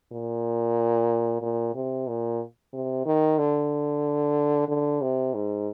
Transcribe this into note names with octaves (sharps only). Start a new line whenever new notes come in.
A#2
A#2
C3
A#2
C3
D#3
D3
D3
C3
G#2